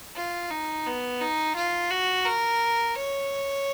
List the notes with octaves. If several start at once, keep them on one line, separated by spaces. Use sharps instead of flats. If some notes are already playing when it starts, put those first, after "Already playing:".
F4
D#4
B3
D#4
F4
F#4
A#4
C#5